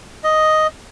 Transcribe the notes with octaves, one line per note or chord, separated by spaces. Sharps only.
D#5